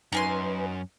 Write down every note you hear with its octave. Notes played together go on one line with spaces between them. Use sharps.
F#2 D#4 B4 G#5 C6